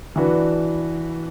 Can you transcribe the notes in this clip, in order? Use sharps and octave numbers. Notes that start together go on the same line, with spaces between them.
E3 D4 F#4 B4